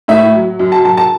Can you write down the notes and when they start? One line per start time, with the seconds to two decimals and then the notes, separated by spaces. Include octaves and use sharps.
0.08 A2 E5
0.35 F#3
0.59 F#2
0.72 A5
0.85 F#3 A5
0.97 A5